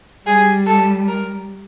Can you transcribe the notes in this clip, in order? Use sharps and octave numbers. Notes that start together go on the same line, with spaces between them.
G3 G#4
A4
A#4